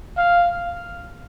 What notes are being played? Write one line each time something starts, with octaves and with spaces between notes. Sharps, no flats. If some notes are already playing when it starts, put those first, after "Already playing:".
F5